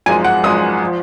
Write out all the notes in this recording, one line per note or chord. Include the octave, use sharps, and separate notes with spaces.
G#1 F#2 F3 G#3 G#5
F#5
G#1 F#2 F3 G#3 D#6
F3